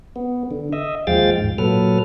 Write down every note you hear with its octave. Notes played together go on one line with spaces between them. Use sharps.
B3
D3
D#5 E5
D#2 F3 G#3 F5 G5 A6
G#2
A#2 F#3 A4 B4 F6